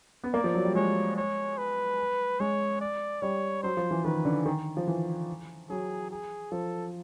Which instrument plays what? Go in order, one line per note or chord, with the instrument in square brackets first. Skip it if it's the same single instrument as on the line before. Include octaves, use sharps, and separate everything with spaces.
[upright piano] B3
[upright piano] A#3 [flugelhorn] D5
[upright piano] F3
F#3
G3
[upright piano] G#3 [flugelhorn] C#5
[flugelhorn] C#5
B4
[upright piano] G#3 [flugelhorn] C#5
[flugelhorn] D5
[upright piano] G3 [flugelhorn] C#5
[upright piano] F#3 [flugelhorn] C5
[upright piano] F3
E3
[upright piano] D#3 [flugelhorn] B4
[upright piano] D3
D#3
F3
E3
[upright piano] F#3 [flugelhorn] G#4
[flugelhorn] G#4
[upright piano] F3 [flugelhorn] A4